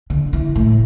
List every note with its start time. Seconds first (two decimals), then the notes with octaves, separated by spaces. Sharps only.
0.10 D3
0.33 E3
0.56 A2